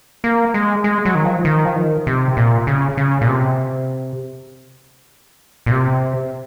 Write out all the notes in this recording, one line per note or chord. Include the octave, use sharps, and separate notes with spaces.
A#3
G#3
G#3
F#3
D#3
F3
D#3
F3
D#3
C3
A#2
C#3
C#3
A#2
C3
A#2
C3